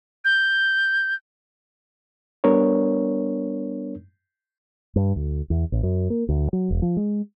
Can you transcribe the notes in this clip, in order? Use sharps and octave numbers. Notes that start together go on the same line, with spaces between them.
G6
G3 B3 D4 A#4 C#5
G2
D2
E2
A1
F#2
A#3
D2
F#3
E1
F3
G#3